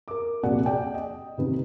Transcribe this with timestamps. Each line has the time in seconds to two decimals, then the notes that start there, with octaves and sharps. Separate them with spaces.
0.08 A#4 D6
0.43 D#1 A#1 C3 F#4 D5 F#5
0.66 G#4 D5 G5
0.94 D#5
1.38 A1 C3 D#3 B4